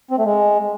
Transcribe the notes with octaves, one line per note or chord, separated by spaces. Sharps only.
C4
A3
G#3